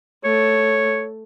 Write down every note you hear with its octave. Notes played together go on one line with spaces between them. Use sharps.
A3 C#5